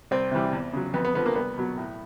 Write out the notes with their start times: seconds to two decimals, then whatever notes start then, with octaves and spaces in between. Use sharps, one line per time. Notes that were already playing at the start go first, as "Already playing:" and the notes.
0.11 C2 C4
0.31 C3 E3 G3
0.53 E2
0.73 C#3 F#3
0.94 F2 B3
1.05 B3
1.15 D3 F3 B3
1.26 A#3
1.35 C2 B3
1.58 B2 F#3
1.77 A2